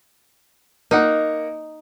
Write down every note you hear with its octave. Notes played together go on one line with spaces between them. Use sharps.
A#3 D#4 F#5